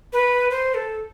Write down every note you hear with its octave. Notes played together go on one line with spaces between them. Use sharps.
B4
C5
A4